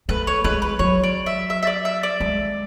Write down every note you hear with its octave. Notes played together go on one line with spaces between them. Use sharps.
A3 B4
C#5
G#3 B4
B4
F#3 C#5
D5
E5
E5
E5
D5
E5
D5
G#3